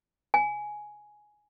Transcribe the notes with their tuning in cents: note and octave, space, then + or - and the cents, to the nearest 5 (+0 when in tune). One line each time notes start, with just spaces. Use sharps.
G#5 +5